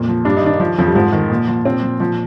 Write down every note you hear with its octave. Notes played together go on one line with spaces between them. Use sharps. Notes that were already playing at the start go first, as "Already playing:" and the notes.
Already playing: F2 A#2
F3
G2 D4
D#4
D#3 D4
F3
F2 F3
G3
G#2 F3
D#3
A#2
F3
A#2 C4
F3
A#2 F3